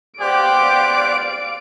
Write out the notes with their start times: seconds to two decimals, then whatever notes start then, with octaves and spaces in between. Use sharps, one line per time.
0.21 B3 G4 C5 D5 F5 F#6 D7